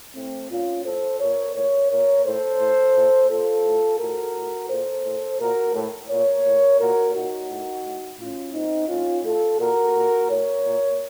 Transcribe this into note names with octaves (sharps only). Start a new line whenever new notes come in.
A2 A3 C4
A#2 C#4 F4
A2 A4 C5
A#2 A#4 C#5
A2 A#4 C#5
A#2 A#4 C#5
A2 A4 C5
A2
A#2
A#2 F4 A4
A2
A2 F#4 A#4
A2
A#2 A4 C5
A2
A#2 F#4 A#4
A2
A#2 A#4 C#5
A2
A#2 F#4 A#4
A#2 D#4 F#4
A2
A2
A2 C#4 F4
A#2 C4 D#4
A2 C#4 F4
A2 F4 A4
A#2 F#4 A#4
A#2
A2 A#4 C#5
A#2